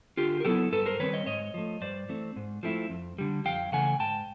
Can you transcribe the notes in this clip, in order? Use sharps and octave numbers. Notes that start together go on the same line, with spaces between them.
D3 F4 G4
A#4
F#3 B3 E4 G4 A4
G2 A4 B4
A#4 C5
D#3 G3 C4 B4 C#5
C#5 D#5
G#2 C#5 D#5
F3 A3
G2 C5 D5
E3 A3 C4
G#2
F3 A3 C4 E4
F2
D3 G3
F2 F5 G5
C#3 E3 A3 F#5 G#5
G#2 G5 A5